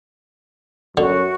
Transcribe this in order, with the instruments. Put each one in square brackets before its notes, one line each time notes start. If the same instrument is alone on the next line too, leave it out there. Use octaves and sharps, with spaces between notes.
[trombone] F#2 [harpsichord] D3 [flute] F#4